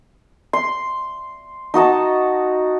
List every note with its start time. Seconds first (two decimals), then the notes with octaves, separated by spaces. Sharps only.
0.53 C6
1.74 D#4 F#4 D#5 A5